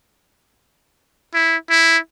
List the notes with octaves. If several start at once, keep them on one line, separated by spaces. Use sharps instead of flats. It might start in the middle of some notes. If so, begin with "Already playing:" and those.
E4
E4